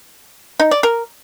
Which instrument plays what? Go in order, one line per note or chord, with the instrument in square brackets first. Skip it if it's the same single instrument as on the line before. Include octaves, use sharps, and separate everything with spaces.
[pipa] D#4
D5
A#4